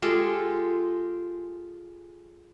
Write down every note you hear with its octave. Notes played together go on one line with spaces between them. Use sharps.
G#3 F4 G4 A4